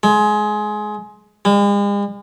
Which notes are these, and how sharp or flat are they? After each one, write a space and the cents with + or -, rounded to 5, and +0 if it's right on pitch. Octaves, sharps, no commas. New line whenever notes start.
G#3 +20
G#3 -45